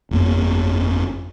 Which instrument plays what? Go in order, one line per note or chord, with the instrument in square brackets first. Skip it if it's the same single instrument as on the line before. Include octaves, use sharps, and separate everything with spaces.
[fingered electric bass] G1 F2 A#3